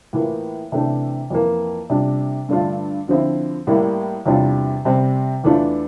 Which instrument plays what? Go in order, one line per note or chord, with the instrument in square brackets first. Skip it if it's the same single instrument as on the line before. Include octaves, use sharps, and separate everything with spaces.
[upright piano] A2 E3 A#3 F4
C3 E3 A3 D4
F2 E3 A#3
C3 G3 D4 F4
G2 D3 A3 D4 F4
D3 F3 C4 E4
A2 G3 A#3 E4
E2 C3 G3 D4 F4
C3 G3 C4
E2 E3 A3 D4 F4